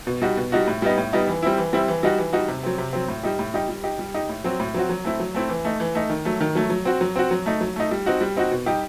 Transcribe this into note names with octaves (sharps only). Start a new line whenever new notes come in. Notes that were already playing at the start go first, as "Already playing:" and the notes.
B2
G3 D#4 F#4
B2
G3 D#4 F#4
A2
G3 B3 D#4
A2
G3 B3 D#4
E3
G3 C4 E4
E3
G3 C4 E4
E3
G3 D#4 F#4
E3
G3 D#4 F#4
C3
F#3 C4
C3
F#3 C4
A2
G3 D#4 G4
A2
G3 D#4 G4
G3
D#4 G4
G3
D#4 G4
A2
F#3 C4 F#4
A2
F#3 C4 F#4
F#3
A3 C4 E4
F#3
A3 C4 E4
E3
A3 D#4
E3
A3 D#4
D#3
F#3 A3
D#3
F#3 A3
F#3
C4 F#4
F#3
C4 F#4
F#3
A3 D#4
F#3
A3 D#4
G3
C4 D#4 F#4
G3
C4 D#4 F#4
B2
G3 D#4 G4